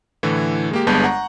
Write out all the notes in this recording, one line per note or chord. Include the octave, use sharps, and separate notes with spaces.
A2 D3 E3
G#3 A#3 G4
G1 G2 G#3 B3 A5 G6
F#5 A#5 C#6